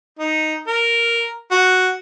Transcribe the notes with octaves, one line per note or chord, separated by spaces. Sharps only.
D#4
A#4
F#4